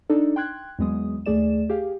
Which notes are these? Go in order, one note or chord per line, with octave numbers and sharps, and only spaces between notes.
D4 D#4 A4 D5
G5 C6 F#6 G#6
E2 F#3 G#3 B3 D#6
D#2 A3 G#4 D5 E7
G4 G#4 F5